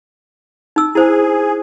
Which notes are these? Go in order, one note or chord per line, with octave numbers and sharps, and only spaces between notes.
D#4 E6
E4 G#4 C5